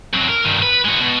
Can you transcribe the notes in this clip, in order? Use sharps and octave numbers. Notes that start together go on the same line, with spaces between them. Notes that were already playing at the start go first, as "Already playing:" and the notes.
F2 F#3
A#4
G2 D#3
B4
G#3 F#4
B2